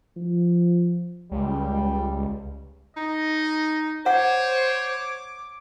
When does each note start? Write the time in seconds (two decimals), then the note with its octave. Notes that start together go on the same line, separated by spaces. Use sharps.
0.16 F3
1.31 C#2 G3
2.97 D#4 D#5
4.06 C5 C#5 F#5 D6